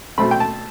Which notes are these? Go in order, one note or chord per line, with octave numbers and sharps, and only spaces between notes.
B2 A3 C4 B5
G5
A5